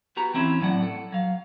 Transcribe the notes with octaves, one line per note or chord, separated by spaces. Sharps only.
B3 F#4 G4 A#5
E3 C4 C#4 E4
A2 F#3 D5 F#5
A4
F#3 F5